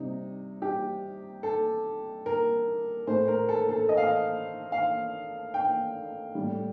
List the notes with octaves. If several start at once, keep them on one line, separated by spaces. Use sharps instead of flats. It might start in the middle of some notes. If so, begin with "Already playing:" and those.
Already playing: C3 G3 D#4
G4
A4
A#4
A2 A3 C5
A#4
A4
A4
D#5
F5
D#5
F5
G5
A2 G3